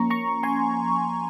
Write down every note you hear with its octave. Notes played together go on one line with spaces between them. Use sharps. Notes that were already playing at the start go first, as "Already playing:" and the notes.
Already playing: F3 A#3 C#4 A#5 C#6
A#5 C#6
G#5 C6